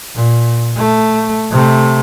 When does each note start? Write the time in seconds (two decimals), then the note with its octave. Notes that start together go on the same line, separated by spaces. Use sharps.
0.15 A#2
0.77 A3
1.51 C3 A3